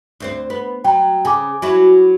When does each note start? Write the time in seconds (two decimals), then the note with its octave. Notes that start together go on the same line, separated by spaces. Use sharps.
0.20 D2 C4 C5
0.50 B3
0.84 F#3 G5 A#5
1.25 C#3 G#5 D6
1.62 F#3 E4 F#4